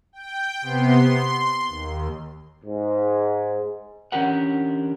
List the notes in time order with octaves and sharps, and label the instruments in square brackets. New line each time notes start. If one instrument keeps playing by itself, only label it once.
[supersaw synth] G5
C3 B3 C6
C6
D#2
[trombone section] G#2
[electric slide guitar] E3 C#4 D4 G4 A#4 F#5